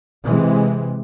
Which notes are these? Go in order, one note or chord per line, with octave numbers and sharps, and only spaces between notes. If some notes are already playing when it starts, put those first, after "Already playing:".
C3 E3 G#3